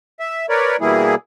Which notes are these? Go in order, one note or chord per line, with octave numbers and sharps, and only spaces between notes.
E5
A#4 B4 C#5 D5
B2 E3 G3 A#3 E4 G#4